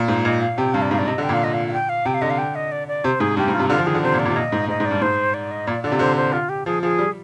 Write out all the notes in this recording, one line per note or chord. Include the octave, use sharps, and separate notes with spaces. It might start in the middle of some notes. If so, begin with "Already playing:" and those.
Already playing: A#2
G#2 F5
A#2 D#5
F5
C3 G5
G2 F5
D5
G#2 F5
D5
C3 D#5
D3
G5
A#2 F5
D#5
F5
F5
G5
F5
C3 G5
F5
D3 D#5
F5
G5
D#5
D5
D5
C3 C5
G#2 G#4
G2 G4
G#2
F4
C3
D3 F4
F3
D#3 G#4
D3
C3 C5
A#2
D5
A#2
C3
A#2 D#5
G#2
G#2 D#5
G#2
D5
G2
G#2 C5
D5
D#5
A#2 D5
D3 D5
C3
D3 C5
C5
F4
G4
F3 G#4
F3 G#4
G3